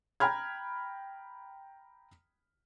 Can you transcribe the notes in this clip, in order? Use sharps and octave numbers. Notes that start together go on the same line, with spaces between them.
G5 A#5 B5 F6 G#6